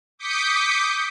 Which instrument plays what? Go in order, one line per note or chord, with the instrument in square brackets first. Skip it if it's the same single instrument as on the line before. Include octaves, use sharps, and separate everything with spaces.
[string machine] D6 D#6 G6 B6 C#7